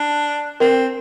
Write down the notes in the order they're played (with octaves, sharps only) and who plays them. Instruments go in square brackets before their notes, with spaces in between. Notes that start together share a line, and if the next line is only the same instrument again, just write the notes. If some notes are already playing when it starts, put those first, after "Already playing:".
Already playing: [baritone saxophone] D4
[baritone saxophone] C4 [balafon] A#4